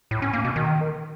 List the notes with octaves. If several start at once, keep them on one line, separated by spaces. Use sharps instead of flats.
A2
C#4
A#3
B2
D#3